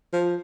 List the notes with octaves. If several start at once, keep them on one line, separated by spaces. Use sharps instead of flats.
F3